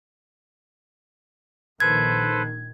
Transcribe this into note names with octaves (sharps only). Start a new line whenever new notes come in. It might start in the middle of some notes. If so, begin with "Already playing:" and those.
A#1 D#3 A4 B4 C5 G#6